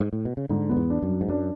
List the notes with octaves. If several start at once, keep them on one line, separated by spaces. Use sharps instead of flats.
G#2
A2
B2
C#3
G#2 D3
F#2 B3
E2
D4
F#2
F#3
G#2
F#2 D4